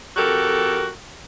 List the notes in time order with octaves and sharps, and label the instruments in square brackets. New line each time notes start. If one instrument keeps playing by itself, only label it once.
[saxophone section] F2 F#4 G4 A4 A#4